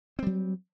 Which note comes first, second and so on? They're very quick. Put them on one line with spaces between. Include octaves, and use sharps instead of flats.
C4 G3 F#3